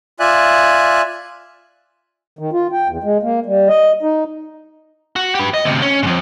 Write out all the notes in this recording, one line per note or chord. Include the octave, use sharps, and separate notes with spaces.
F4 D5 E5 G#5 F#6
D#3
F4
G5
E2
G#3
A#3
G3
D#5
D#4
F#4
G4 B4
D#5
D2 C3
C#4
F2 G#2